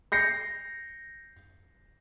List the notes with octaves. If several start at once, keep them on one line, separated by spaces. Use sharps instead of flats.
G6 A#6 C7 C#7